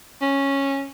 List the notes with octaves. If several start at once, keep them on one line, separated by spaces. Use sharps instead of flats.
C#4